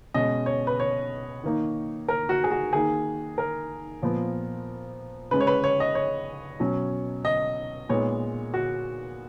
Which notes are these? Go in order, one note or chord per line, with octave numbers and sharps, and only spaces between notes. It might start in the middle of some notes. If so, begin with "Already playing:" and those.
B2 G#3 C#4 D#5
C#5
B4
C#5
D#3 A#3 D#4
A#4
F#4
G#4
F#4
D#3 A#3 D#4 G#4
A#4
A#2 F3 B3
C#3 G#3 C#4 B4
C#5
B4
C#5
D#5
C#5
B2 F#3 C#4
D#5
A#2 G#3 B3 D#4 C#5
F#4